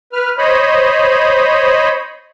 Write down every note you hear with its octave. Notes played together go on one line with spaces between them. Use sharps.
B4 F6
C5 C#5 D#5 B5